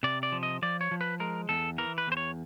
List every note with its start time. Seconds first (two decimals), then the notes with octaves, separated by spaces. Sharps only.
0.03 C3 D5
0.23 D5
0.32 F3
0.43 D#5
0.62 F3 D5
0.81 C#5
0.91 F3
1.01 B4
1.20 G#3 A#4
1.49 E2 A4
1.78 E3 A#4
1.98 B4
2.07 E2 C5
2.17 C#5